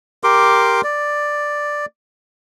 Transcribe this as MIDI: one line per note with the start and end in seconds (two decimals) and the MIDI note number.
0.24 0.81 67
0.24 0.81 70
0.24 0.81 84
0.24 0.81 86
0.84 1.86 74